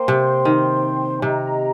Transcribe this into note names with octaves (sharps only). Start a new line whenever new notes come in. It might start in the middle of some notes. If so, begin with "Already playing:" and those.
Already playing: A#3 C5 G5 C6
C3
D#3
C3 G4 D#5 G5 A#5